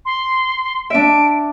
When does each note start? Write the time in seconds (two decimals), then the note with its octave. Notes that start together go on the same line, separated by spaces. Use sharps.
0.05 C6
0.90 D4 E5 D7